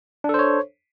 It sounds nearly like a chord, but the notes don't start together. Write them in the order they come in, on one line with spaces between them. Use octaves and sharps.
D4 A4 C5 C#5